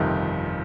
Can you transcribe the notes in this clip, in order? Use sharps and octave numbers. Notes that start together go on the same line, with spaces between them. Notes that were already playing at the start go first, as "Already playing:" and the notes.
Already playing: G1 F2 C3 D#3